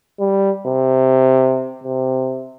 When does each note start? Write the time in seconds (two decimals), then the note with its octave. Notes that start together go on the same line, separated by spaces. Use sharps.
0.20 G3
0.67 C3
1.84 C3